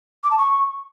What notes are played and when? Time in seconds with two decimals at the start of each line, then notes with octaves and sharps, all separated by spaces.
0.24 D6
0.31 A5
0.38 C#6